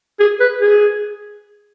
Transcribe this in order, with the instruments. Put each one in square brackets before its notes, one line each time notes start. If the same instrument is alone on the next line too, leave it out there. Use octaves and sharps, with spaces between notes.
[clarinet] G#4
B4
G#4